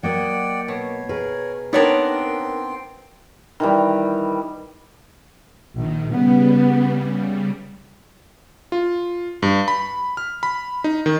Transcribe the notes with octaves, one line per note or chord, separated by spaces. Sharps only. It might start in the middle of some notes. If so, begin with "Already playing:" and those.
F#3 A#3 D5 D#5 F#5 G5
B2 C#5
G#4 A#4 B4 C#5
B3 C4 D4 D#4 A#4 C#5 G5 C6
D#3 E3 G3
A#1 D#3
C#3 G3 B3
F4
G2
B5
F6
B5
D#4
D#3